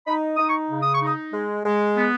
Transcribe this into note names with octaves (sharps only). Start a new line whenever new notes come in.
D#4 B5
D#4 D#6
C#6
C#3
D#6
C#6
D#4 D#6
G#3
G#3
B3